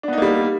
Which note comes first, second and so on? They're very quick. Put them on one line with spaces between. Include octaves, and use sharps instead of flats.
D4 B3 D#4 A#3 G3